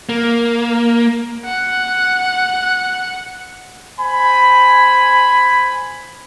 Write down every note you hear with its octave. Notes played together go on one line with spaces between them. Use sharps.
A#3
F#5 F#6
C5 G#5 B5